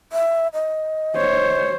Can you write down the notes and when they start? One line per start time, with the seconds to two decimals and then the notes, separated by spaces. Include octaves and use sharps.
0.13 E5
0.54 D#5
1.16 C5 C#5